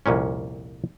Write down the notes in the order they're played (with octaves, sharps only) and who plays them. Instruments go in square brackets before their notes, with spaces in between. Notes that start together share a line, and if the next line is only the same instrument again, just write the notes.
[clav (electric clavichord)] C2 F2 A#2 C#4